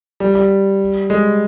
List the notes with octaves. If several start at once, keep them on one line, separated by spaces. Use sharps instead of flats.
G3
G3
G#3